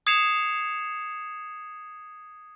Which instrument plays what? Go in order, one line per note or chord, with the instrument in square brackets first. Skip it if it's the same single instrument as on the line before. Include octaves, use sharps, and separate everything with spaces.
[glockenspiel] D#6 G#6 C7 C#7 E7 F7